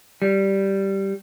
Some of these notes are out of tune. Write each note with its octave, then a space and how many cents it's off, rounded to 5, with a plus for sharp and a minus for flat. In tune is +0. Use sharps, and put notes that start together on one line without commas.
G3 -5